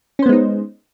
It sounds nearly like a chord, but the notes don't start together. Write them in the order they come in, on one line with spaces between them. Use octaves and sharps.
C#4 C5 B3 G#3 D#4